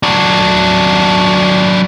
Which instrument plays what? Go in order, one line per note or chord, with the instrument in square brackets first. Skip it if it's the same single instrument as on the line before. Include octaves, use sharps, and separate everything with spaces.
[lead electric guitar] F#3 D4